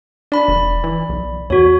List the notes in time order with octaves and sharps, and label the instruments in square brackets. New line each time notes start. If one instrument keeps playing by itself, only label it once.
[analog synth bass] D4 [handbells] D5 B5
[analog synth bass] E1
E3
B1
[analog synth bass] E2 [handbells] F#4 C#5